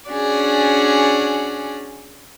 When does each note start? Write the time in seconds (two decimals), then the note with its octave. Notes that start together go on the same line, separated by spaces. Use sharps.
0.10 C#4 D4 F#4 G#4 D5